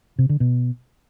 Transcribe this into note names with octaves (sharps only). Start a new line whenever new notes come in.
C3
D3
B2